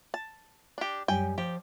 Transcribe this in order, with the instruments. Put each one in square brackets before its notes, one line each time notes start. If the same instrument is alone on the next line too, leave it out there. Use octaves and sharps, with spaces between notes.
[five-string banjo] A5
D4 G4
[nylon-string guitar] F#2 G3 G#5 [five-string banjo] G5
[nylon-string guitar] F3 [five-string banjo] G4